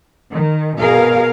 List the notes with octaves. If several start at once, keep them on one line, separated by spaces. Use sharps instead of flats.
D#3
B2 G#4 A#4 F5